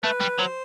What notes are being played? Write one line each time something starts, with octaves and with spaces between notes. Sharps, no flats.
A3 B4
G3
F#3 C5